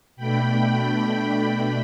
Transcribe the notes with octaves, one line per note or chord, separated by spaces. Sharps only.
B2 A3 D4 G5 B5
G5 B5